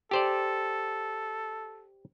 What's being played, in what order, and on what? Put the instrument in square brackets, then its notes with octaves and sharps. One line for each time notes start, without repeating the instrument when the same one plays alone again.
[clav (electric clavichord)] G4 C5 D5 [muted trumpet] A4